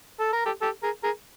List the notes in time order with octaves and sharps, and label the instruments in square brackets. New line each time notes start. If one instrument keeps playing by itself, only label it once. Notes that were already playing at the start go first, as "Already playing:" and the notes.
[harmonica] A4
A#4
G4 A4
G4 A4
G#4 A#4
G#4 A#4